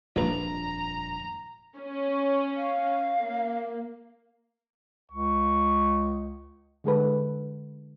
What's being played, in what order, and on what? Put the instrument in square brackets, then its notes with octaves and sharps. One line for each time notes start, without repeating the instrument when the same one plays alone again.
[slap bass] D#1 F2 D4 [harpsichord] A#1 B4 [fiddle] A#5
[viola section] C#4
[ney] F5
[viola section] A#3
[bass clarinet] C#2 [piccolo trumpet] C#6
[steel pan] D3 G#3 A4 B4